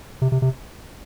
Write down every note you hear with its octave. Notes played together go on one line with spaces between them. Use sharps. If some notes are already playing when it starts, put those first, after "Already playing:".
C3
C3
C3